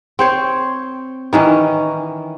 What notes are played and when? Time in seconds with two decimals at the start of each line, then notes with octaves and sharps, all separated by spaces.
0.19 C4 C5 C#5
1.33 D#3 E3 C#4